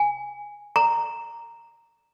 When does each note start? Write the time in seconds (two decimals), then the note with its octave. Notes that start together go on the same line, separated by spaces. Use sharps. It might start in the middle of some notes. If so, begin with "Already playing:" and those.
Already playing: G#5
0.76 A#5